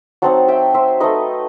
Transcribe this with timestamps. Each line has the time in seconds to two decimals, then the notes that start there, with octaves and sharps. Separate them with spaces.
0.22 F#3 C4 D#4 F#5 A5
0.48 E5 G5
0.74 C5 E5
1.00 A3 D#4 B4 D#5